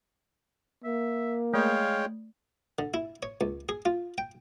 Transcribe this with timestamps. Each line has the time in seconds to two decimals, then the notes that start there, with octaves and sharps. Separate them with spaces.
0.84 A#3 E5
1.54 G#3 A3 C#5 F5 G5
2.79 D3
2.94 E4
3.23 C#5
3.41 C#2
3.69 G#4
3.85 F4
4.18 G5